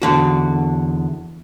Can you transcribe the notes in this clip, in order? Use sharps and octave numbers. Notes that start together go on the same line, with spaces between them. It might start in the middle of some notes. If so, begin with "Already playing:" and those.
E2 D3 F#4